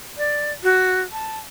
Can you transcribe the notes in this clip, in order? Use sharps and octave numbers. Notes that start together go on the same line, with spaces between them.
D5
F#4
A5